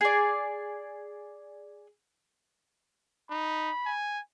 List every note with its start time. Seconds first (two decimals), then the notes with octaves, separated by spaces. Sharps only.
0.01 G#4 D5
3.30 D#4 B5
3.86 G#5